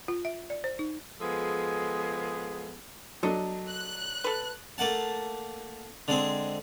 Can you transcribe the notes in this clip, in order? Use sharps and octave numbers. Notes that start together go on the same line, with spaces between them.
F4
E5
D5
C5
D#4
F3 G#3 B3 G#4 A4
F#3 D4 A4 D#5
F#6
A4 B4
A3 A#3 F#5 A5
D3 G#3 C4